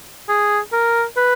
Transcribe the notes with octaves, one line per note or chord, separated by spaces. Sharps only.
G#4
A#4
B4